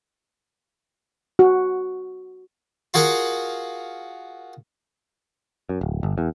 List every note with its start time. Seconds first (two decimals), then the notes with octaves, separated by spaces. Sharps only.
1.39 F#4
2.94 F4 F#4 G#4 A#4 F5 F#5
5.69 F#2
5.81 D1
6.03 G1
6.18 E2